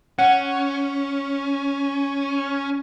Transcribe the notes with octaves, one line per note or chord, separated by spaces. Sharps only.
C#4 F#5